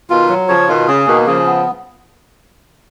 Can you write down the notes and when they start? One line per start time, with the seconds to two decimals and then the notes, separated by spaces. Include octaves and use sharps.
0.10 B2 D#3 F4
0.29 F#3
0.48 C#3 F3 C#5
0.68 B2 D#3 F4
0.87 C#3 G#4
1.07 B2 D#3 A#3
1.27 C#3 F3 G#4
1.46 B3